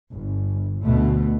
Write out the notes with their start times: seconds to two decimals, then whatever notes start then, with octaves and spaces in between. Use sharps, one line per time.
0.12 G1
0.84 D2 B2 A3